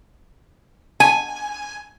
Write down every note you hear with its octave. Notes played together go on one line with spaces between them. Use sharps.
G#5